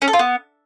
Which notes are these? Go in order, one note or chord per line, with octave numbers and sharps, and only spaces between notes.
C#4
A4
F4
B3